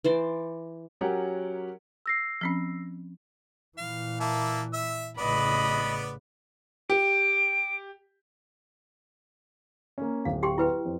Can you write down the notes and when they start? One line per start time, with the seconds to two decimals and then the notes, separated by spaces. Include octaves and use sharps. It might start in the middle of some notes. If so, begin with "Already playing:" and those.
0.04 E3 C5 D5
1.01 F#3 C#4 G4 A#4 F#5
2.06 E6 A#6 C7
2.41 F3 C4 C#4
3.78 A#2 E3 F5
4.20 A#3 E5 A5
4.73 E5 E6
5.18 A1 C#3 B3 B4 D5 D#5 B5
6.90 G4 D7
9.98 A#3 C#4
10.25 D1 F5
10.43 G4 G5 C6
10.58 E4 B4 G5
10.85 F2